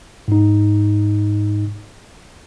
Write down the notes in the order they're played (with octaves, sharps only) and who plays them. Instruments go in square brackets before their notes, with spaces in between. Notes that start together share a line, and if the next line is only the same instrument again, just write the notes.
[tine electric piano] G#2 D#4